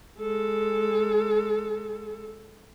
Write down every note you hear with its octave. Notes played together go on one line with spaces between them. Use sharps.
G#3 A4